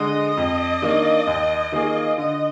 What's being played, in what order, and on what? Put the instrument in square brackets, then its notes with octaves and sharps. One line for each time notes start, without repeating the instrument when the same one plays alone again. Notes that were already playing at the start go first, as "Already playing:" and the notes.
Already playing: [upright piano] D3 G#3 [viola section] D#5
[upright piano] F2
D#3 A#3 D4
D#2
D#3 A#3 F4 G#4
[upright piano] D3 [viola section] D#5